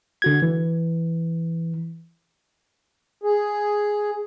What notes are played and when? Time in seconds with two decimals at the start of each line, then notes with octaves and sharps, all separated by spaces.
0.22 D3 F#4 G#6
0.42 E3
3.24 G#4